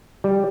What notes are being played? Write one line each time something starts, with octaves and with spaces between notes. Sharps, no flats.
G3